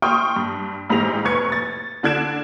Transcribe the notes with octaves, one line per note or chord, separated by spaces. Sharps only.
G5 C6 C#6 D#6 F6 G6
G2
A1 G#2 G4 G#4 A#6 F7
F1 B4 C#6 G#6 C#7
A6
D3 D4 F#6 G#6 D7 E7